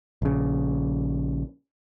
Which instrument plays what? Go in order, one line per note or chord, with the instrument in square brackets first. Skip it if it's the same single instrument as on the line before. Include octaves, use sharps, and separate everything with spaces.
[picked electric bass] A#1 C#3